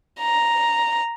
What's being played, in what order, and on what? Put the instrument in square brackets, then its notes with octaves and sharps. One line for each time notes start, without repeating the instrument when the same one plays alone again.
[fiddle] A#5